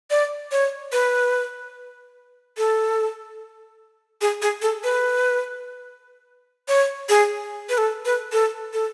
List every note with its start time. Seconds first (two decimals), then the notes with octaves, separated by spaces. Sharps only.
0.11 D5
0.52 C#5
0.92 B4
2.57 A4
4.21 G#4
4.42 G#4
4.62 A4
4.84 B4
6.68 C#5
7.09 G#4
7.69 B4
7.78 A4
8.05 B4
8.32 A4
8.73 A4